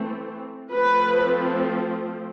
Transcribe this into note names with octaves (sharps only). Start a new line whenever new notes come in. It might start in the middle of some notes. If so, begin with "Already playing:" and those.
Already playing: E3 A3 C4
F3 A3 C4 B4